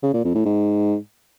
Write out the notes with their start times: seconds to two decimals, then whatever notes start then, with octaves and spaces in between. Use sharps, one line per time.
0.03 C#3
0.14 A#2
0.24 F2
0.35 A2
0.45 G#2